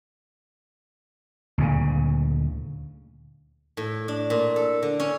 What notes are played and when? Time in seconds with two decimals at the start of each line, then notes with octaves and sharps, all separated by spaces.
1.58 D2 A#2 C#3
3.77 A2
4.08 D4
4.30 A#2
4.56 A4
4.83 D3
5.00 C#4